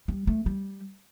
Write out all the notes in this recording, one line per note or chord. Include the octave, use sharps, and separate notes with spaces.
G3
A3
G3